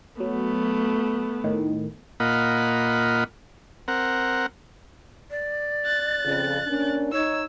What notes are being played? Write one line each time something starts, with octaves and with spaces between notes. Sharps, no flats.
F#3 A3 B3
A2 D#3
A#2 A#3 F4 D#5 F#5 B5
C4 A#4 F#5
D5
F#6 A6
F2 C#3
A#3 C#4 D4
D#4 C#5 E6